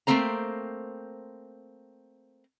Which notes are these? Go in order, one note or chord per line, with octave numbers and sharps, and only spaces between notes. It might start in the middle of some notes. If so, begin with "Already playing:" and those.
A3 A#3 C4 C5 A#5